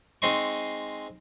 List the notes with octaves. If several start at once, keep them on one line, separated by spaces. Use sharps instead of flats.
G#3 C4 D#4 C6 C#6